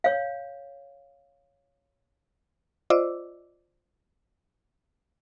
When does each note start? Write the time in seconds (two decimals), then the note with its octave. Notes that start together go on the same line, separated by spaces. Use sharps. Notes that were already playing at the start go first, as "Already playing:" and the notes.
0.04 C#5 F5
2.90 F4 C5 D5 D#5 D6 E6